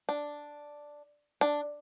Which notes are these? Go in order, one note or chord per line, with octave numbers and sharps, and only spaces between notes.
D4
D4